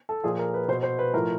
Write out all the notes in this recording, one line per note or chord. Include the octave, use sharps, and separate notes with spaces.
A4
A#2 F3 G#4
A#4
B4
B2 C5
C5
B4
A2 F3 A#4